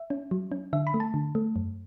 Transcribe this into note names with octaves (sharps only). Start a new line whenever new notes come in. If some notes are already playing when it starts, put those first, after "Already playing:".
Already playing: E5
C#4
F#3
C#4
D3 E5
B5
A3
A5
D3
A3
F#2